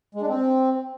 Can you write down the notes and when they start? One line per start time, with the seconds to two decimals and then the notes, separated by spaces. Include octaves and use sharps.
0.15 G#3
0.21 D4
0.28 C4